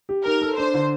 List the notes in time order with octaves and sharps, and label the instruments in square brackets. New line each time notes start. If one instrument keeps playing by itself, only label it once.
[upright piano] G4
[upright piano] D#4 [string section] A#4
[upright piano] A4
[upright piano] D4 [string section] C5
[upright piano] D3